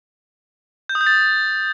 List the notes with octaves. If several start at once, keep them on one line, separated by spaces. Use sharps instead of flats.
G6
D#6
G6
A6